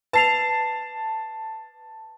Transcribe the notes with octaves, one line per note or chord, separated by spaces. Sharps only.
B4 A5 C7 F7